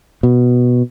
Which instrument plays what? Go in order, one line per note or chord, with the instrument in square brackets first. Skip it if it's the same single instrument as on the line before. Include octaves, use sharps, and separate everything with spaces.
[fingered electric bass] B2